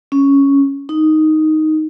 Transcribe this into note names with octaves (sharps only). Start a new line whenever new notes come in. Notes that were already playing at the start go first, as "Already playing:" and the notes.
C#4
D#4